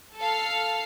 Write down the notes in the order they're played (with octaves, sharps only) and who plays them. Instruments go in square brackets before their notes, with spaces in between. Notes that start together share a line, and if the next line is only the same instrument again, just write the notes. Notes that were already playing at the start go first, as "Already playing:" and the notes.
[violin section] A4 F5 F6